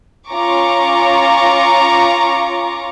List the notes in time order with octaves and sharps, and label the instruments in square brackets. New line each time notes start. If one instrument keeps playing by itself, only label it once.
[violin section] C#4 F4 A#5 C#6 D6